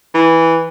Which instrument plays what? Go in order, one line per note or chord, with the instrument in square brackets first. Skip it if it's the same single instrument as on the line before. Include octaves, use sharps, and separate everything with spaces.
[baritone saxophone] E3